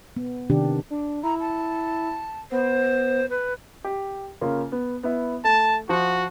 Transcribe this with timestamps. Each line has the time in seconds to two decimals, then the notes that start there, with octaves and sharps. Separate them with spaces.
0.16 B3
0.50 C3 D#3 D4 G4
0.90 D4
1.23 E4 A#5
1.40 A5
2.51 B3 C5
3.30 B4
3.84 G4
4.41 C#3 A#3 F4
4.72 B3
5.03 B3 E4
5.44 A3 A5
5.89 F3 F#4